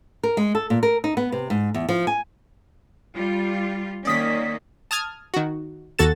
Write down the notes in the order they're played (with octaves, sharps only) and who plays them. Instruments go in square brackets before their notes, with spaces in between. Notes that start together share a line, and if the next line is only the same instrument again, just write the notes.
[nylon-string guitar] A#4
G#3
A4
A#2
A#4
D#4
B3
C3
G#2
E2
F3
G#5
[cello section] G3 F4
[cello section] D#3 A#3 C#4 [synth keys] D5 D#6 B6
[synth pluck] A5 D#6 F6 G#6
D#3 F#4
D#2 F#4 A4 A6 E7